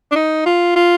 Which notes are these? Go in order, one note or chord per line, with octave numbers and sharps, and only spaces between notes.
D4
D#4
F4
F4